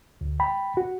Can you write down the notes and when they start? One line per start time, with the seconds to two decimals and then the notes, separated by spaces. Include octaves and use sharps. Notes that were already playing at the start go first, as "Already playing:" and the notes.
0.21 D2
0.40 G5 B5
0.77 F#4